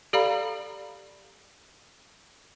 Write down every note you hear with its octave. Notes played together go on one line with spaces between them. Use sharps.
G4 A4 D5 F5 A#5 B5